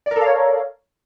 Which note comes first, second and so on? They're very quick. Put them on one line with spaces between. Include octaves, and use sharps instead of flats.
D5 A#4 A4 F5 C#5